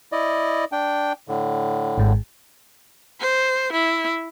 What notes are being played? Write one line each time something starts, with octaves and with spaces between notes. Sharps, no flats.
E4 D5 D#5
D4 G5
A2 D3
G#1 G#2
C5
E4